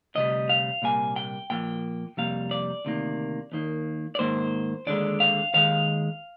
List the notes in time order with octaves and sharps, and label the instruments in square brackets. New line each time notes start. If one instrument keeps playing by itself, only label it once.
[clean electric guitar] D2 C3 G3 D#5
F5
C2 A#2 G3 A#3 G#5
G5
A#2 F3 A#3 G5
F2 C3 G3 A#3 F5
D5
D2 C3 D#3 A#3
D#2 D#3 A#3
D5
G#2 D#3 A#3 C5
D#2 D3 G#3 D5
F5
D#2 D#3 G#3 F5